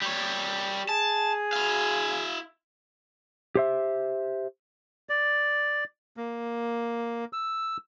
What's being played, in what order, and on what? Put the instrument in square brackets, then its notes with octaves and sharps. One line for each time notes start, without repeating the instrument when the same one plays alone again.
[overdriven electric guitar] G3 C#5
[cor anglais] G#4 [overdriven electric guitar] A5
[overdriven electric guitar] E4 F5
[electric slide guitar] G4 C5 E5
[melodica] D5
A#3
E6